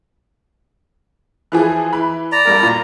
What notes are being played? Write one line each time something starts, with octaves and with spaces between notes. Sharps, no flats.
E3 F3 G#4
E3 B5
D5 A#5
G2 G3 A#4
A#2 A6